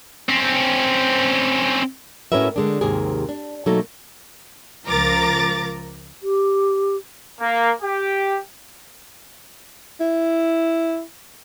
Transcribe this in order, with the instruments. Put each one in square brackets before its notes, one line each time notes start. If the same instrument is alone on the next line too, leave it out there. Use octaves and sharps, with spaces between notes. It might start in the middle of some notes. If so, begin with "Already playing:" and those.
[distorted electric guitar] C4 C#4
[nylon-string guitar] A2 C#4 F#4 A#4 B4 E5
D3 G#3 D4
D#2 G#2 C3 G#4 A#4
D4
B2 F#3 A3 A#3 D#4 A4
[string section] C#2 F3 A#4 A#5 D6 A6
[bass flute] G4
[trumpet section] A#3
G4
[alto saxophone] E4